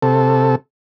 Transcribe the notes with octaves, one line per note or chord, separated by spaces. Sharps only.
C3 A4